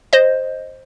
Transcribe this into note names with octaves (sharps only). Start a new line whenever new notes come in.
C5 D#5